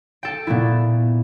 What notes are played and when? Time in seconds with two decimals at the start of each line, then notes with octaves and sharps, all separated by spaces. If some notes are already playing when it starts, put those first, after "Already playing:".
0.23 A4 G5
0.47 A#2 A3 B3 E4